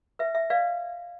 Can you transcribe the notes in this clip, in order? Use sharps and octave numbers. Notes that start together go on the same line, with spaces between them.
B4 E5
E5
B4 D5 F5